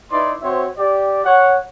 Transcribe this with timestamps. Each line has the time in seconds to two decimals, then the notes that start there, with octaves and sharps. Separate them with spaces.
0.11 D#4 E4 B4 D5 C6
0.42 C4 F#4 C5 C#5 E5
0.78 G4 D5
1.24 C#5 F#5